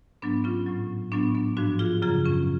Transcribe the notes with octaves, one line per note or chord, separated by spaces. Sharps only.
G#2 F#3 B3 D4
C#4 F4
A2 F#3
A2 F#3 B3 D4
B3 D4
G#2 F3 D4 F#4
F4 G#4
F#2 C#3 F#3 F4 G#4
C#4 F4